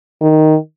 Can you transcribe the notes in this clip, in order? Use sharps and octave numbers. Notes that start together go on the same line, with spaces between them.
D#3